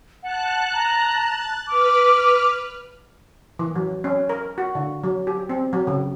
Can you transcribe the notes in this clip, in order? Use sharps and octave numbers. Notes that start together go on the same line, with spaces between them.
F#5 A5 F#6
A#5
B4 D6 F6
E3
F#3
C#4
A#4
F#4
D3
F#3
G4
C4
F#3
C#3